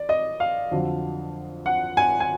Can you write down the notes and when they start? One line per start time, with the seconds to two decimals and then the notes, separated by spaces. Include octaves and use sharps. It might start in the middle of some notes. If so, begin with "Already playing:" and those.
Already playing: D5
0.09 D#5
0.40 F5
0.71 F2 D3 F#3
1.66 F#5
1.97 G#5
2.20 G#5